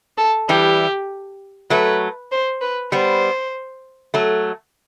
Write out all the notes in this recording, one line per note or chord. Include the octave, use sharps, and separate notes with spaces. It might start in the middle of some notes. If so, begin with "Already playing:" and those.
A4
E3 G3 G4
F#3 A3 B4
C5
B4
G3 B3 C5
F#3 A3